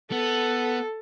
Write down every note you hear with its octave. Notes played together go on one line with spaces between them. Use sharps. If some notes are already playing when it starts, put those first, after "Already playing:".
B3 A4